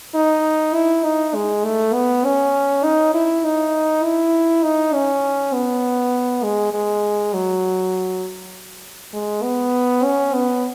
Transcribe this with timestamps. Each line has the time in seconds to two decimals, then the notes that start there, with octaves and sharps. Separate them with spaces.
0.15 D#4
0.74 E4
1.04 D#4
1.35 G#3
1.64 A3
1.94 B3
2.25 C#4
2.84 D#4
3.14 E4
3.44 D#4
4.04 E4
4.64 D#4
4.94 C#4
5.53 B3
6.43 G#3
6.74 G#3
7.33 F#3
9.13 G#3
9.43 B3
10.04 C#4
10.34 B3